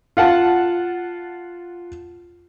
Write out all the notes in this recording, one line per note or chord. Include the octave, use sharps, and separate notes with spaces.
F4 F#5 A5